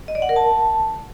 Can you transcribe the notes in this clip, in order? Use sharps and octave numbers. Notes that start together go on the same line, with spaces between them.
D#5
D5
F#5
A#4
A5